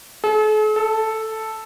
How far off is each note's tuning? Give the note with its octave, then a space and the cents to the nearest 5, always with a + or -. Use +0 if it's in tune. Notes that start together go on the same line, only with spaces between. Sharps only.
A4 -45
A4 +0